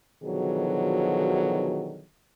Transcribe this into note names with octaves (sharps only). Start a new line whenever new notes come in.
B2 D3 D#3 F3 F#3 G#4